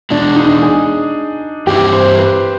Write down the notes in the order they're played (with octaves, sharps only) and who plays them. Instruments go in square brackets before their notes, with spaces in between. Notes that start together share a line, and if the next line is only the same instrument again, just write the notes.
[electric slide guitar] E2 B2 G#3 [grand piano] D4
[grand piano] D#4
G#4
[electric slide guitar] G2 E3 G3 C4 E4 [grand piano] G4
[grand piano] C5
B4